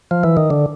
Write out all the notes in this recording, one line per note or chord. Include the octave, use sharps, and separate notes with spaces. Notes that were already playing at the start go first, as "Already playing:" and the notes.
F3
E3
D#3
D3